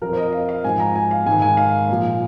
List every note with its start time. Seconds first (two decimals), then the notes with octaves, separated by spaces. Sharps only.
0.02 F2 F3 A#4
0.13 C5
0.17 D#5
0.33 F5
0.49 F5
0.64 G#2 F3 G#5
0.80 A#5
0.96 G#5
1.11 F5
1.26 G#2 D#3 G#5
1.42 G#5
1.57 F5
1.89 A#2 F3